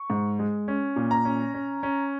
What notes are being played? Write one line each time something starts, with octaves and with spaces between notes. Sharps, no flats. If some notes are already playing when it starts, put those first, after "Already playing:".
Already playing: C#6
G#2
G#3
C#4
A#2
A#5
C#4
C#4
C#4